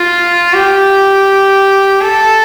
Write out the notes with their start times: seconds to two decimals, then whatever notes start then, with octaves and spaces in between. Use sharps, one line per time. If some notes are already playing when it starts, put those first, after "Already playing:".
Already playing: F4
0.53 G4
2.01 A4